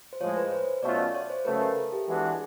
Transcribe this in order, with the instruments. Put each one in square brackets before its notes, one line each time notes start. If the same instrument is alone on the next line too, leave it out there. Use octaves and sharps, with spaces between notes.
[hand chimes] C5
[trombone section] A2 F3 G#3 [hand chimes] C#5
[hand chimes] B4
C5
[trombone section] B2 F#3 A3 C#4 F4 [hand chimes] D5
[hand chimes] D5
C#5
C5
[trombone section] C#3 F#3 A3 [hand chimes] B4
[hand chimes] A#4
A4
G4
[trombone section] E3 G#3 B3 D4 F#4